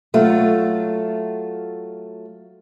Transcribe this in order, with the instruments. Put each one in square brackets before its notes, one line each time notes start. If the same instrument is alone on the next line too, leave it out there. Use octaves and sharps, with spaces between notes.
[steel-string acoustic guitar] F#3 A3 F4